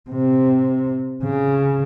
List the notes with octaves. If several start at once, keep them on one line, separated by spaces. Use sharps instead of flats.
C3
C#3